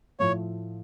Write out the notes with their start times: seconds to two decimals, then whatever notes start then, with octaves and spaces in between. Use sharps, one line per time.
0.20 A2 F3 A3 C#5